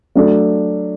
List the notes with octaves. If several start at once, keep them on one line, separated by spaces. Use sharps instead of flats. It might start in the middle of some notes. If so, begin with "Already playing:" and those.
F#3 A3 D4 A4